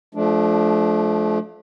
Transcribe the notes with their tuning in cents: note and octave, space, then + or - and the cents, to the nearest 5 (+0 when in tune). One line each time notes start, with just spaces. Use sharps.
F3 +0 A3 -35 D4 +0